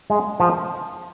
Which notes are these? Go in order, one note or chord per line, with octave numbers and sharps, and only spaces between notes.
G#3
F3